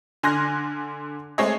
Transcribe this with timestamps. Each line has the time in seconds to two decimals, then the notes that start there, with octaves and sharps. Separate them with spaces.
0.23 D3 G#5 C6 F6 F#6 A#6
1.38 G#3 A3 C4 G#4 C#5 D#5